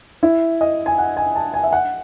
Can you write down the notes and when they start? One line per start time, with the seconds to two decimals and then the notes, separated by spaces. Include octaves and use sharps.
0.23 E4
0.61 D#5
0.86 G#5
0.98 F#5
1.17 G#5
1.36 A5
1.54 G#5
1.64 E5
1.73 F#5